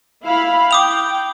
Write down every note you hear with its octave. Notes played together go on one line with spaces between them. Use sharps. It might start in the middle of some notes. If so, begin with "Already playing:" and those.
E4 F5 B5
G5 D6 D#6 F7